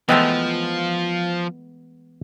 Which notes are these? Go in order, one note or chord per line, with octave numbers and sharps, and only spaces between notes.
E3 F3 G#3 A3 B3 D#5 G5